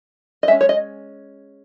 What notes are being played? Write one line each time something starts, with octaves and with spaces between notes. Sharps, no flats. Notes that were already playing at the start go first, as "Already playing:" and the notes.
D#5
G#3 C#4 E5
C#5
D#5